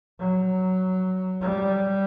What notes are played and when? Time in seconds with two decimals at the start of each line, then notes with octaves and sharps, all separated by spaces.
0.19 F#3
1.41 G3